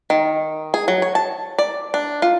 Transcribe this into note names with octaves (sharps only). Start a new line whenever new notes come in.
D#3
G#4
F#3
C#5
A5
D5
D4
F4